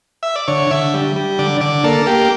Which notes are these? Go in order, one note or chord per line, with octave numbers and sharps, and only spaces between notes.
E5
D5
D3 C#5
D3 E5
G3
G3
D3 D5
D3 D5
A#3 A4
A#3 G4